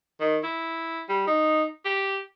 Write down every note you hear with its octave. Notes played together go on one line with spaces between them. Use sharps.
D#3
E4
G3
D#4
G4